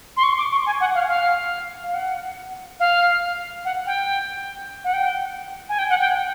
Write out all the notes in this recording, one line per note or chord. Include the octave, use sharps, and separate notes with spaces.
C6
C#6
D6
C#6
G#5
F#5
F5
F5
F5
F#5
F5
F#5
G5
F#5
G5
G#5
G5
F#5
G5